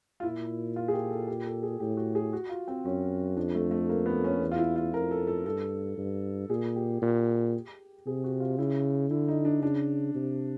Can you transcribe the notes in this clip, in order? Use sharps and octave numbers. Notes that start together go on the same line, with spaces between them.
F4
A#2 E4
F4
G#4
G4
A4
G4
A4
G#4
A2 G4
F#4
G#4
F#4
F4
C4
F#2 C#4
F2 D4
A3
A3
A#3
B3
C#4
E2
F4
E4
F4
F2 A#4
A4
A4
G2 A4
G2
A#2 G#4
G4
A#2
C3 G#4
F#4
F4
C#3 E4
D3 E4
D#4
D4
C#3 D4
C3